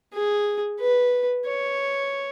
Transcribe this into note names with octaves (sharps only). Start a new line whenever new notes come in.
G#4
B4
C#5